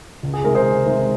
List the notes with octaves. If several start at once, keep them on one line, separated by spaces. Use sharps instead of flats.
C#2
G#4
C3 D#3 G#3 A#4
G#4 C5
C#2
C3 D#3 G#3